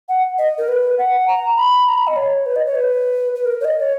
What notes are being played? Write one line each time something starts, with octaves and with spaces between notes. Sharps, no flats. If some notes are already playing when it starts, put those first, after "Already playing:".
F#5
D#5
A#4
B4
F#5
A#5
B5
A#5
B5
D#5
C#5
B4
D#5
C#5
B4
B4
A#4
C#5
D#5
C#5